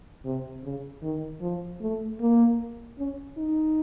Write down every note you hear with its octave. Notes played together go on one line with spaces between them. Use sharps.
C3
C#3
D#3
F3
A3
A#3
C#4
D#4